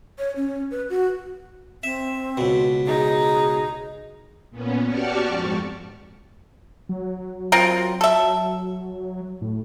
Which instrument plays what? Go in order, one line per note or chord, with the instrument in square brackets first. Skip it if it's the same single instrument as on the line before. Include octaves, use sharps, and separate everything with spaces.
[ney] C#5
C#4
B4
F#4
[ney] C4 [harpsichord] E5
[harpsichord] C#2 B2
[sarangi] D#4 [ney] G#4
[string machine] A#2 B3 C#4
F#4 G4 D5 A5 C#6 F6
F2 G#2
[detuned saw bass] F#3
[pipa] C4 F4 A#4
A4 E5
[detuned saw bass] A2